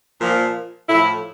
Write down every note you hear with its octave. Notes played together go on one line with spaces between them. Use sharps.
A#2 F3
A2 F3 E4